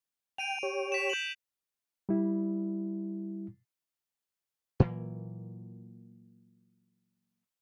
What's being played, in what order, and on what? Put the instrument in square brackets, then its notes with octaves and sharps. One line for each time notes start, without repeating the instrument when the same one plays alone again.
[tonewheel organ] G5 [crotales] D7 D#7 F7
[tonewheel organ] G4 C#5
[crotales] B6 E7
G6 F#7
[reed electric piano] G3 E4
[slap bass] A#2 E3 F#3 A#3